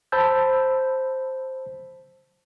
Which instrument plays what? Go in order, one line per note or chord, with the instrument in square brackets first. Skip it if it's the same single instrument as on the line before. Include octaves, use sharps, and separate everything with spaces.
[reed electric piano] C5 A5 B5 E6 G6